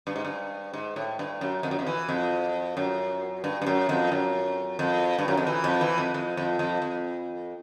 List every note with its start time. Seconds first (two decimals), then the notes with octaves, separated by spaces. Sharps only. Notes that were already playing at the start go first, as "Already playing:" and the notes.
0.07 G2
0.16 G#2
0.25 G2
0.74 G#2
0.96 A2
1.19 G2
1.41 F#2
1.63 F2
1.71 F#2
1.79 F2
1.87 E3
2.09 F2
2.77 F#2
3.44 G2
3.62 G2
3.66 F#2
3.89 F2
4.12 F#2
4.79 F2
5.19 G2
5.28 F#2
5.37 F2
5.47 E3
5.64 F2
5.81 E3
5.98 F2
6.14 F2
6.37 F2
6.59 F2
6.82 F2